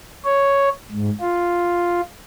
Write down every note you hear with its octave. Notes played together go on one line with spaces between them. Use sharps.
C#5
G#2
F4